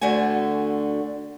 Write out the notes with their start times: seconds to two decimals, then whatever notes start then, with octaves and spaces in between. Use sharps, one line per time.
0.01 D2 D3 A3 F#4 G#5